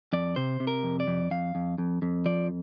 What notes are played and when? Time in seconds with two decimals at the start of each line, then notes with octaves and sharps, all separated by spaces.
0.13 F2 D5
0.36 C3 C5
0.60 C3
0.67 A#4
0.83 F2
1.00 D5
1.07 F2
1.31 F2 F5
1.55 F2
1.78 F2
2.02 F2
2.26 F3 D5